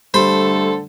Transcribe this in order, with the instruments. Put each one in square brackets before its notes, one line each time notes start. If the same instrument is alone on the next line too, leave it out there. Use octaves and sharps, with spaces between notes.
[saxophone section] D3 A3 A4 [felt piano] G3 [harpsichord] C5 B5